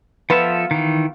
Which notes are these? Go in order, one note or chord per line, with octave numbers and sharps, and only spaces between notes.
F3 B3 F4 A4 E5
D#3 E3